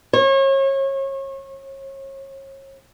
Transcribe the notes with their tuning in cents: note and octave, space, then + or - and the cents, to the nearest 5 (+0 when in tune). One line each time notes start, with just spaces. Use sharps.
C#5 -35